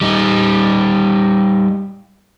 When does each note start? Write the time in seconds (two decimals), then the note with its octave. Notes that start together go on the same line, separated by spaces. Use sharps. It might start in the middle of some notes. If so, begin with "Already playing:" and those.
0.01 G3 D#4